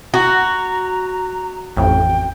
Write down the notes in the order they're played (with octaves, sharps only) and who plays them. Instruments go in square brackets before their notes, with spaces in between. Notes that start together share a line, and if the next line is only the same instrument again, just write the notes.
[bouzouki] F#4 [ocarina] A#5
[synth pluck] A1 F2 [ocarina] G5